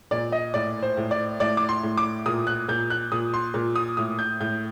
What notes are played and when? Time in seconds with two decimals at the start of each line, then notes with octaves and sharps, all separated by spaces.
0.11 A#2 D5
0.32 D#5
0.54 A2 D5
0.82 C5
0.97 A2
1.11 D5
1.40 A2 D5
1.57 D6
1.69 C6
1.83 A2
1.98 D6
2.26 A#2 D#6
2.47 F#6
2.69 A#2 G6
2.90 F#6
3.12 A#2 D#6
3.34 C6
3.54 A#2
3.76 D#6
3.97 A2 D#6
4.19 G6
4.40 A2 G6